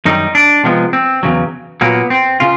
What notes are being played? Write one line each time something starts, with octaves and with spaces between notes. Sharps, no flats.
F#2 D#3 G3 D#4
D4
C3 F3 G#3 B3
C4
E2 C#3 F#3
A#2 F#3 A#3 B3
C4
C#3 F4